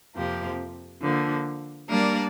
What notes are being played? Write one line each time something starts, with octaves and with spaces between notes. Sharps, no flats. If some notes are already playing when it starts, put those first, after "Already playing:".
F2 C3 F3 A#3 G4
D3 F3 A#3
G3 A#3 D4 A#4 D5